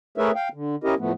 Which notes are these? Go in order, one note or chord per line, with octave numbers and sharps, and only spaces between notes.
A3 G#4 A#4 B4 C#5 E5
F5 G5
D3
C#4 E4 G4 A#4 D#5
A2 F3 A3 B3